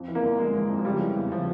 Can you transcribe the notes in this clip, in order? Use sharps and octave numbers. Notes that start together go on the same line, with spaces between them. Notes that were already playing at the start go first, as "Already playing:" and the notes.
Already playing: F2
E3
A#3
G1
G1 G#3
E3
F2
F3
C#3 G3
E3
E2
C#3 F3